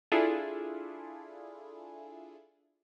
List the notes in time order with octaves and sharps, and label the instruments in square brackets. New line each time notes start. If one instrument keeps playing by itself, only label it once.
[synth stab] D4 E4 F4 G#4 A4